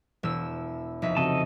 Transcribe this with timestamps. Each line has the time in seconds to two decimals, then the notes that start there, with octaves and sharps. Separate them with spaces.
0.23 E1 E6 E7
1.02 F1 D#4 E5
1.17 C#3 C4 F#4 A4 D#5 A5